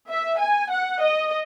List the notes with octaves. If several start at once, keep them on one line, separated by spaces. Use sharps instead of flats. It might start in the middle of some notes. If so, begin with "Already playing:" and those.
E5
G#5
F#5
D#5